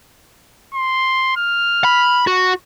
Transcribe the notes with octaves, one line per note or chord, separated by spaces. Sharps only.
C6
F6
B5
F#4